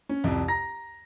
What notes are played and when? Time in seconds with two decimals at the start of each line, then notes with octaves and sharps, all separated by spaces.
0.09 C#4
0.24 C2 F2
0.48 A#5 A#6